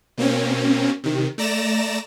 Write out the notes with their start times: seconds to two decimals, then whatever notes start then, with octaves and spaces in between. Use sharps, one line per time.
0.18 B2 A#3 C4 C#4
1.04 C3 D#3
1.38 A3 D5 A#5 A#6 E7